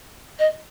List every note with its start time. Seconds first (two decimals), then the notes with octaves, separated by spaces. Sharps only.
0.39 D#5